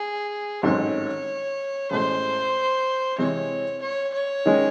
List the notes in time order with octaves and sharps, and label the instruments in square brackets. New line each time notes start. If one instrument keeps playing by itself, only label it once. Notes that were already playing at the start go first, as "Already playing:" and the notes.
Already playing: [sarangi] G#4
[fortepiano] A1 G#2 D#3 F#3 C4 [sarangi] C#5
[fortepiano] A1 A2 G#3 [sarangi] C5
[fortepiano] C3 E3 G#3 C4 [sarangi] C#5
[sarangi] C#5
C#5
[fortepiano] D#3 G#3 C#4